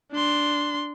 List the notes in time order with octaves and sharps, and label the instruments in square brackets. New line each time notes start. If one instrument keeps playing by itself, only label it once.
[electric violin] D4 C6